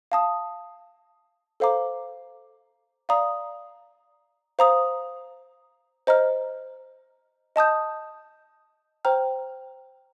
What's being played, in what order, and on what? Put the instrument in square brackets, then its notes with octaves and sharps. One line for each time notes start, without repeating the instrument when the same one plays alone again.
[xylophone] F5 A5 D#6
A4 C5 F5 A#5 D6
D5 F5 A#5 D#6
C5 F5 A#5 D#6
C5 D#5 A#5 F6
D#5 A5 D#6 G6
C5 G5 A#5 F6